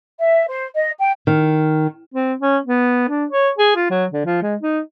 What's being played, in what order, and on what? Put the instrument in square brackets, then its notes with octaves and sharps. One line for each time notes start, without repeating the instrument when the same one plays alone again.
[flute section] E5
C5
D#5
G5
[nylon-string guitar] D#3
[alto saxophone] C4
C#4
B3
D4
C#5
G#4
F4
F#3
D3
F3
G#3
D#4